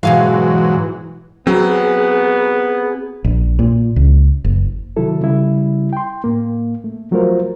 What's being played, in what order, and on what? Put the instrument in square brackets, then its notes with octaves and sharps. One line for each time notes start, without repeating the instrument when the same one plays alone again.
[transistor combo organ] G#2 F#3 [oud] B2 G#4 F5 [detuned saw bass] E3
[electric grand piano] F#3 [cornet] B3 [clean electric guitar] C4 A#5 [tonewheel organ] G#4
[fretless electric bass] A#1
A#2
C#2
F#1
[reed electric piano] C3 D#3 F#3 E4 A4
C#3 G3 E4
G5 C6
A2 A#3
A3
F3 F#3 A3 F4 A#4 C5